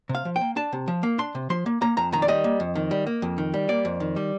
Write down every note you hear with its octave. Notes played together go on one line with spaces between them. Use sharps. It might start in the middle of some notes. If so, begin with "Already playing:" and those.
C3
F5
F3
G5
A#3
D4 A5
C3
F3
A#3
D4 C6
C3
F3 C6
A#3
A#3 A#5
F2 A#5
D#3 A#5
D5
G3 D#5
A#3
F2
D#3
G3
A#3
F2
D#3
G3
A#3 D5
F2
D#3
G3